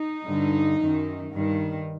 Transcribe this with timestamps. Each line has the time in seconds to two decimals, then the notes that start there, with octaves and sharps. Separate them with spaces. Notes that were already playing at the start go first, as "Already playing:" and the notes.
Already playing: D#4
0.25 G2 D3
0.79 F#2 D#3
1.33 G2 D#3